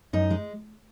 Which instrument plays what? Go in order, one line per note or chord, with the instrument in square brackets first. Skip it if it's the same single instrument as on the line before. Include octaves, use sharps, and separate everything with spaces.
[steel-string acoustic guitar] F#2 D#4
G#3